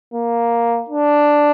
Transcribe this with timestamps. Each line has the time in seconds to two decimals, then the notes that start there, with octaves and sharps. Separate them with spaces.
0.14 A#3
0.89 D4